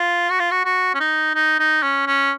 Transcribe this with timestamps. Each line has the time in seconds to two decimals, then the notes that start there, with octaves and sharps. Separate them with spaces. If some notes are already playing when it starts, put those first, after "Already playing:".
Already playing: F4
0.30 F#4
0.39 F4
0.51 F#4
0.65 F#4
0.94 C#4
1.00 D#4
1.35 D#4
1.60 D#4
1.83 C#4
2.07 C#4